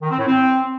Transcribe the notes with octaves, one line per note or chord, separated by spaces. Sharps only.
D#3
C4
A2
C4